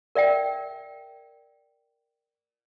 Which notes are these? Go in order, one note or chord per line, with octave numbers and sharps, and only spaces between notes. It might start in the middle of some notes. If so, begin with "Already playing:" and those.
A#4 D5 E5 G5